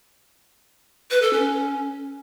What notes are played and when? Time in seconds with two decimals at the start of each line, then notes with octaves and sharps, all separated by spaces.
1.11 B4
1.22 A4
1.33 C#4